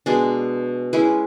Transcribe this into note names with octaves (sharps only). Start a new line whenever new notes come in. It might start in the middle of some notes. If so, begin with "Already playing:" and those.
B2 G#3 D4
G#3 C#4 E4 B4